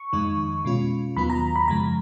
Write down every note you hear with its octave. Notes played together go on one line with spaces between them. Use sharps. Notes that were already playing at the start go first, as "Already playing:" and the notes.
Already playing: C#6
F2 D#3 G#3 D#4
B2 G#3 C#4 F4
D#2 D#3 F#3 B3 F4 B5
A#5
B5
F#2 C#3 F3 G#3 A#5